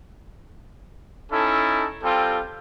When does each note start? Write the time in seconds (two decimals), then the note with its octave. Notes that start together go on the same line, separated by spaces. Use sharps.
1.31 C#4 D#4 E4 A4
2.03 G3 C4 F4 A4 G5